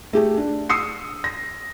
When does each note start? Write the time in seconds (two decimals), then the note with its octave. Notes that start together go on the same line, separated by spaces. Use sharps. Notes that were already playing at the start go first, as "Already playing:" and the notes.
0.13 A3 G4 G#4
0.38 D4
0.69 D#6 E6 C7 C#7
1.24 A#6